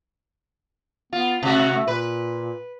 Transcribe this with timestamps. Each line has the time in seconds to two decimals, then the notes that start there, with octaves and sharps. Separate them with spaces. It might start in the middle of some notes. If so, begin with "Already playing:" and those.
1.13 B3 F4
1.43 C3 A3 F#4
1.76 A3
1.87 A#2 B4